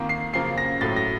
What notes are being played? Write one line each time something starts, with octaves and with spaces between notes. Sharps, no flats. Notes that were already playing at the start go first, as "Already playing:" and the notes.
Already playing: F2 D#3 A#3
C7
F#2 C#3 F3 A#3 C7
A#6
A2 F#3 A3 A6
A#6